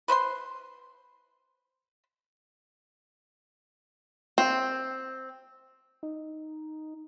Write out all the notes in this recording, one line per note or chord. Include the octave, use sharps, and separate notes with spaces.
B4 C5 B5 C6
C4
D#4